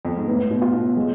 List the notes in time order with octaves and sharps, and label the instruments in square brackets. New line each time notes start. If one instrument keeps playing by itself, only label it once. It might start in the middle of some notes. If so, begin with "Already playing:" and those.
[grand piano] F2
G#2
[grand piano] A2 [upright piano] B3
[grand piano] B2
[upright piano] F4
[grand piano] B2
[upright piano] G#3